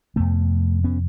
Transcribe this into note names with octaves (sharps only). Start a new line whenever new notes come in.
F2 C3 A3 B3
B3 C#4